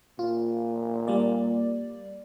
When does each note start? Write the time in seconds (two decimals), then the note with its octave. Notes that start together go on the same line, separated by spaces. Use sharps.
0.19 A#2 F4
1.07 G3 A#3 D5